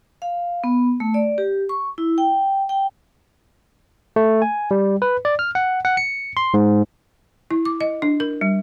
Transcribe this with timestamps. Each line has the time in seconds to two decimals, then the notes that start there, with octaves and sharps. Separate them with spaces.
0.22 F5
0.64 B3
1.00 A3
1.14 D5
1.38 G4
1.69 C#6
1.98 E4
2.18 G5
2.69 G5
4.16 A3
4.42 G#5
4.71 G3
5.02 B4
5.25 D5
5.39 F6
5.55 F#5
5.85 F#5
5.97 C#7
6.37 C6
6.54 G#2
7.51 E4
7.65 D6
7.81 D#5
8.02 D4
8.20 A#4
8.41 G3